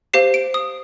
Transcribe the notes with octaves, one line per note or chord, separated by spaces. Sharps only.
G4 C5 F5 C7
D7
D#6